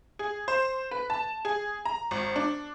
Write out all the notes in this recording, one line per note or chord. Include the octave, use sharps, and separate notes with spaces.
G#4
C5
B4
A5
G#4
A#5
G#1
D4